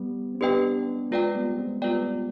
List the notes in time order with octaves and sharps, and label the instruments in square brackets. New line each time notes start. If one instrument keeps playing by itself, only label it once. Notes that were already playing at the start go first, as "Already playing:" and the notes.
Already playing: [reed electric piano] G3 B3
C4
[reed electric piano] B3 D4 [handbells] G4 B4 D#5 G5
[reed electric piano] G#3 C4 [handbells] F4 B4 D5 G5
[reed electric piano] G3 B3
G#3 C4
[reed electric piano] G3 B3 [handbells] F4 B4 D5 G5